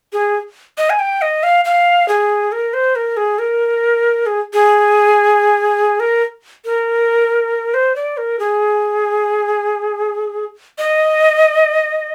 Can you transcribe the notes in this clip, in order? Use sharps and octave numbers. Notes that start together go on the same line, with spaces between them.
G#4
D#5
G#5
G5
D#5
F5
F5
G#4
A#4
C5
A#4
G#4
A#4
G#4
G#4
A#4
A#4
C5
D5
A#4
G#4
D#5